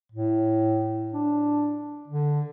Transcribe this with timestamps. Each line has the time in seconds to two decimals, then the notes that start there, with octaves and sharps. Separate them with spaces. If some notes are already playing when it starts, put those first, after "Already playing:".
0.12 A2
1.13 D4
2.08 D3